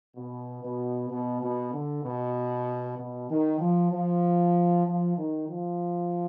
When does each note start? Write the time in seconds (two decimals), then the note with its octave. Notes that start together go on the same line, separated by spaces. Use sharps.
0.16 B2
0.63 B2
1.10 B2
1.41 B2
1.73 D3
2.03 B2
2.97 B2
3.29 D#3
3.60 F3
3.91 F3
4.86 F3
5.17 D#3
5.48 F3